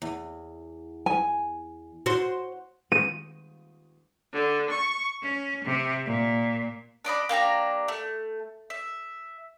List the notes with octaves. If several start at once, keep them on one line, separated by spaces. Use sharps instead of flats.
E2
G#5
F#4 C5
D#7
D3
C#6
C#4
C3
A#2
D4 D5 D#5 B5
A#3 D4 G4 A#5
A3
E5